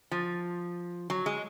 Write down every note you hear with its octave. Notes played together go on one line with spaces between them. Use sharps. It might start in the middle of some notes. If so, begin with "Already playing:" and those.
F3
F#3
G#3